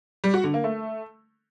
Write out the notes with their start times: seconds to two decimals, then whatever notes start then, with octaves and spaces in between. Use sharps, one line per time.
0.24 G3
0.34 F#4
0.44 D3
0.54 A#3
0.64 A3